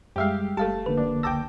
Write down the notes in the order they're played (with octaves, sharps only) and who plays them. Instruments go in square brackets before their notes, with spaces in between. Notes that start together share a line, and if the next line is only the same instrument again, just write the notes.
[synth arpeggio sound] F#2 [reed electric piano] G3 G#3 [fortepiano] G4 E5 F5
[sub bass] F1 [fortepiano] A3 A5 [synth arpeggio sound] G4 F5
[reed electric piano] F2 D3 A#3 [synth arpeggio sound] B4
[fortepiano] D4
[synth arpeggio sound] C#2 A5 A#6 [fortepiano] G5 D6 E6